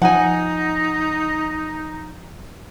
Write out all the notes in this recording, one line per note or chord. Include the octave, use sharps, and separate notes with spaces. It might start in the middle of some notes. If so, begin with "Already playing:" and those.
F3 D#4 F#5 G#5